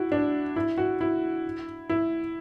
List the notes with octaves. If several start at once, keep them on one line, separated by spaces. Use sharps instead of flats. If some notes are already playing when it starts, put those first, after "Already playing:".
Already playing: E4 F#4
D4
E4
F#4
E4
E4